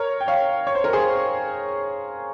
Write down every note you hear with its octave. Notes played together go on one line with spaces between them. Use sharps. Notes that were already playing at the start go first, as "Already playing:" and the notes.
Already playing: A#4 C#5
G5
C#5 F5
C#5
C5
A#4
G#4 C5